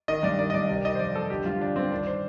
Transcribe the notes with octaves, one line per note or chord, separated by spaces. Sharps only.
D#3 D#5
G2 D5
D#3 D5
D#5
G2 D5
C3 D5
D#3 D#5
C5
F2 D5
F2 A4
D3 G4
G2 F4
D3 D4
G2 C4
D#3 D4
C5